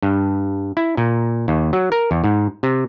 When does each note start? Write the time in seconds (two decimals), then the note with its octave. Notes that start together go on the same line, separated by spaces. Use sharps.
0.03 G2
0.77 E4
0.97 A#2
1.48 D#2
1.73 F#3
1.92 A#4
2.11 E2
2.24 G#2
2.63 C3